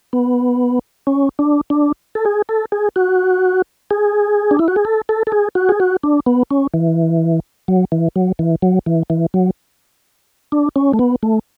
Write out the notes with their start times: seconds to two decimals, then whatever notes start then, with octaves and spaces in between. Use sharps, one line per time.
0.13 B3
1.07 C#4
1.39 D4
1.70 D4
2.15 A4
2.26 G#4
2.49 A4
2.72 G#4
2.96 F#4
3.91 G#4
4.51 D4
4.59 E4
4.68 F#4
4.76 G#4
4.85 A4
5.09 A4
5.27 A4
5.32 G#4
5.55 F#4
5.69 G#4
5.80 F#4
6.03 D4
6.26 B3
6.51 C#4
6.74 E3
7.68 F#3
7.92 E3
8.16 F#3
8.39 E3
8.62 F#3
8.86 E3
9.10 E3
9.34 F#3
10.52 D4
10.76 C#4
10.93 A3
10.99 B3
11.23 A3